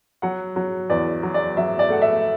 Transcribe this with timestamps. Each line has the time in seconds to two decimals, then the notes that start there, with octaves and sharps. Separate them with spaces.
0.22 F#3 F#5
0.56 F#3
0.90 E2 D5
1.23 F#3
1.34 D5
1.57 F#3 E5
1.79 D5
1.90 A3 F#5
2.02 E5